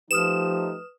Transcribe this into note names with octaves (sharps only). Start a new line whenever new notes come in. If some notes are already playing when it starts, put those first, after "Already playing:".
F3 A3 D#4 G4 B4 D#6 F6 E7